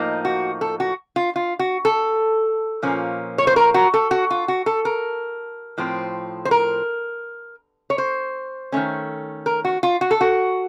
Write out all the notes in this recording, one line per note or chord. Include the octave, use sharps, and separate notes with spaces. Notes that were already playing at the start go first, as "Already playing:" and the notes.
Already playing: A2 F3 A#3 D#4
F#4
A4
F#4
F4
F4
F#4
A4
A#2 F3 A#3 C#4
C#5
C5
A#4
F#4
A4
F#4
F4
F#4
A4
A#4
A2 F3 C4
C5
A#4
C#5
C5
D#3 A3 C#4
A#4
F#4
F4
F#4
A4
F#4